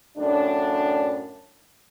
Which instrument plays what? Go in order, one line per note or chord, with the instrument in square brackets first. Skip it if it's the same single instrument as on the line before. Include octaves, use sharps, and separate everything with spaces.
[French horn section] F#2 A2 D4